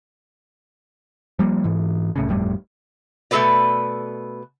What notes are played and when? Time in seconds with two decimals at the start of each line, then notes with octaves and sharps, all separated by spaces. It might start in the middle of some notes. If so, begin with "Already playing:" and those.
1.39 F3 G3 A#3
1.64 G#2 E3
2.16 C2 A2 C#3
2.28 G1 F2 A2 G3
3.31 B2 A3 G#4 A4 B4 D5